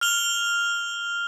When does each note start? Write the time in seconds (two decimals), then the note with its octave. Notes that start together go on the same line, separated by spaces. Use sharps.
0.01 F6 F7 G7